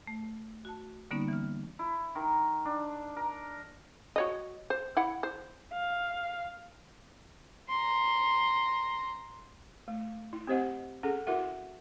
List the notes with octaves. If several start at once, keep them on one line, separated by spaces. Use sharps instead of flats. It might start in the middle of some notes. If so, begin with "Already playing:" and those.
A3
F#4 A5
D3 G3 A#3 B3 C#4 D#4
E3 F6
E4
D#3
D4
A#4
F#4 C#5 D#5
C5
E4 F#5
C5
F5
A#5 C6
A3
E4
C4 G4 C5 D#5 F#5
C#4 G#4 A4 F#5
E4 F#4 A#4 E5 F#5